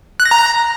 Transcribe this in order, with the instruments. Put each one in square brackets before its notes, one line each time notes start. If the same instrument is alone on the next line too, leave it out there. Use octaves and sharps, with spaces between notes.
[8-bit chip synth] F#6
A#6
A#5